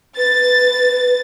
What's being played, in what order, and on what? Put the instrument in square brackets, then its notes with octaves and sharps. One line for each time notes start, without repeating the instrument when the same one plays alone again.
[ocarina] B4 [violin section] A6